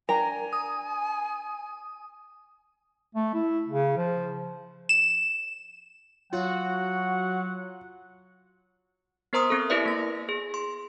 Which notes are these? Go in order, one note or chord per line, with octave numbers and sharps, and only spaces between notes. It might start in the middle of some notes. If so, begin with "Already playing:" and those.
D4 A#4 G5 G#5 A#5
D#6
A3
E4
C#3
F3
E7
F#3 F4 F#4 F#5
B3 A#4 C5 A#5 C6 D#6
B3 C4 A4
E4 G4 A#4 B4 D5 E5
A#3 A#6
G#4
C6